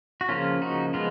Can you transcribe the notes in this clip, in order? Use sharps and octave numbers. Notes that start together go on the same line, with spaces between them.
F#4
C#3 F3 A#3 C#4 F4
D#4 F#4
F3 G#3 B3 F4